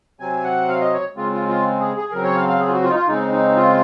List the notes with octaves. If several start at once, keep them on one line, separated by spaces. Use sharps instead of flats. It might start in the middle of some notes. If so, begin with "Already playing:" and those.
C3 F#3 C4 G#5
F#5
F5
D#5
C#5
C#3 G#3 C4 F4
F4
F4
G#4
G#4
C#3 F#3 C4 A#4
C#5
F5
F5
G#4
F4
F#4
F4
D#4
F4
C#3 G#3 C4 D#4
D#4
F4